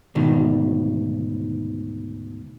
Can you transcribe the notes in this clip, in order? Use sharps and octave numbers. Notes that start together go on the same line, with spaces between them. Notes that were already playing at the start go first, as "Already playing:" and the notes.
D2 G#2 B2 D#3